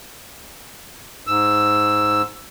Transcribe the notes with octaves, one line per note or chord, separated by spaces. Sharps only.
G#2 E6